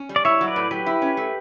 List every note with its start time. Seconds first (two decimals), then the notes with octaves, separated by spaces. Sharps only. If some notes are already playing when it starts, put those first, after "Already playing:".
Already playing: C#4
0.09 G3
0.16 D5
0.25 E4 C#5 E5
0.41 F#3
0.48 B4 D5
0.56 A2
0.71 F#3 G4 B4
0.86 E4
1.02 C#4
1.17 A3